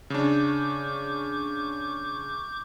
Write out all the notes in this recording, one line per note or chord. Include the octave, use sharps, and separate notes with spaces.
C#3 D4 C#6 D6 G6